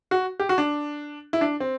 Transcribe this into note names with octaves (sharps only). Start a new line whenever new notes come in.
F#4
G4
F#4
D4
E4
D4
C4